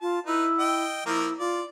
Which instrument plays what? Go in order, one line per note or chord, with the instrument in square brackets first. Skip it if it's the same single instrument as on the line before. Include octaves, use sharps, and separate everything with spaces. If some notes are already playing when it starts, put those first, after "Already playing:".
[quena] F4 [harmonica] A5
[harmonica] D#4 B4 [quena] E4
[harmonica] D#5 G5
[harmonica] F3 A#3 A#4 [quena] E4
[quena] F4 [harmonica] D5